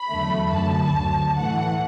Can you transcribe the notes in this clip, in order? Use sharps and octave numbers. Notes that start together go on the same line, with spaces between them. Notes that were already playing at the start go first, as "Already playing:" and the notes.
Already playing: B5
E2 D3 F#3 A3
F#2 D3 A3 A5
D2 D3 F#3
A2 E3 A3 F#5